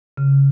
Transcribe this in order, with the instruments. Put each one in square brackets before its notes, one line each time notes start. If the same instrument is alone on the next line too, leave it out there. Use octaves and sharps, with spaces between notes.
[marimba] C#3